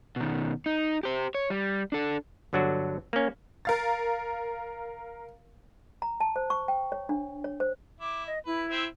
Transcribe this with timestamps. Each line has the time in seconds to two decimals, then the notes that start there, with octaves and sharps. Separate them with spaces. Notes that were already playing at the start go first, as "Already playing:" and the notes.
0.16 B2 D#3
0.66 D#4
1.03 G4 C5
1.35 C#5
1.50 G3
1.92 D4 A4
2.53 G1 D3 F#3 D4 F#4
3.13 A#3 C#4
3.65 A#4 F5 A6
6.02 A#5
6.20 A5
6.36 C5
6.50 C#6
6.68 G5
6.92 C#5
7.09 D4
7.44 C#5
7.60 C5
8.00 E4 D6
8.26 D#5
8.46 E4 B4
8.71 C4 E5